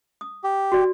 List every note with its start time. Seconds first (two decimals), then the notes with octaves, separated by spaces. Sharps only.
0.21 D#6
0.44 G4
0.72 F#4 D5